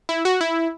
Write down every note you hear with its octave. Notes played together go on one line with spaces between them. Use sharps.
E4
F#4
E4